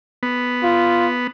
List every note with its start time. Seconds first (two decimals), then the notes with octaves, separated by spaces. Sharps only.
0.23 B3
0.63 F4